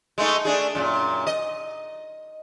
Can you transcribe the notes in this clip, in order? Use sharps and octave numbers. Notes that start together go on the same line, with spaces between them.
G#3 A3 D#4
A3 D4 G#4
F#2 A#2
D#5